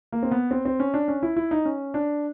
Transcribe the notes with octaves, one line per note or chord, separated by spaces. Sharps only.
A#3
C4
B3
C4
C4
C#4
D4
C#4
E4
E4
D#4
C#4
D4